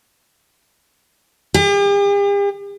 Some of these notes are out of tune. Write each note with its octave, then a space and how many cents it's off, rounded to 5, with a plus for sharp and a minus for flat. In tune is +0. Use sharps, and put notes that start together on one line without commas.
G4 +45